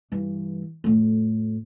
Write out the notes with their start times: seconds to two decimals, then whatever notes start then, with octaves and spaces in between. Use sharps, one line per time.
0.12 G2 E3
0.84 F2 A2